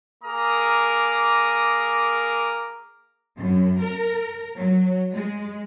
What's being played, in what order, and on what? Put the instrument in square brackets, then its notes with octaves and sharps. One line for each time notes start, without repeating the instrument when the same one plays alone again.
[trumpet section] A#3 G#4 A#4 A#5 D6 D#6
[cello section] F#2
A#4
F#3
G#3